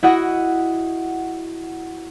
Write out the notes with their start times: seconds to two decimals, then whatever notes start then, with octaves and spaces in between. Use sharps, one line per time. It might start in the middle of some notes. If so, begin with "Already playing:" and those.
0.03 E4 F#4 D#5 F#5